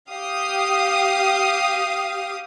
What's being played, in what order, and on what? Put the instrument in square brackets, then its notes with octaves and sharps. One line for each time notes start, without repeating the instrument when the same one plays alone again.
[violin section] G4 F5 D#6